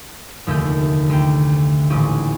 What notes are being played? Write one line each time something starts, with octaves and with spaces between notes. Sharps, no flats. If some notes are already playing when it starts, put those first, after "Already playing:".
F1 D#2 D3 A3 E5 G6
D2 G5
D#1 A1 C#4 G4 G#5